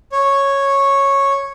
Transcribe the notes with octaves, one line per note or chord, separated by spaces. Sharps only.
C#5